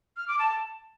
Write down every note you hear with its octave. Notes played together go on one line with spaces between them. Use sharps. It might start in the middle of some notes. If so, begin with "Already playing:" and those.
F6
D6
A5